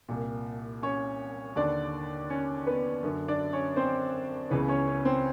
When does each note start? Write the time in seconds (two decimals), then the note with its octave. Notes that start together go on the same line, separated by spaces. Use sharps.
0.08 C2 A#2
0.83 C#4 C#5
1.56 D#2 D3 D4 D5
2.30 C#4 C#5
2.67 B3 B4
3.03 F#2 D3
3.28 D4 D5
3.53 C#4 C#5
3.76 C4 C5
4.50 C#2 C#3 E3 B3 B4
4.68 C#4 C#5
4.87 C#4 C#5
5.05 C4 C5